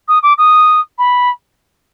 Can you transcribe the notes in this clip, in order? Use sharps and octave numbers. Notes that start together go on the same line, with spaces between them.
D#6
D6
D#6
B5